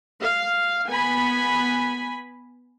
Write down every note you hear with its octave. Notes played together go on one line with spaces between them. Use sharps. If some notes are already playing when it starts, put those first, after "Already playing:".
F5
B3 G#5 B5